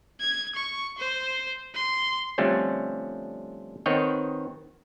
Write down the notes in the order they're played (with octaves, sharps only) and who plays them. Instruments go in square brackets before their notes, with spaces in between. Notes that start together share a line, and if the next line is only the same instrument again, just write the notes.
[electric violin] G#6
C#6
C5
C6
[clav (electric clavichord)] D3 F3 G3 A3 C4 C#4
D#3 B3 C4 C#5 D#5 G5